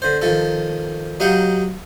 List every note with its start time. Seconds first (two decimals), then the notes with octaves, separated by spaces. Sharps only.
0.02 D3 C5
0.22 D#3 F3 A4
1.20 F#3 D#4 G4 F5 F#5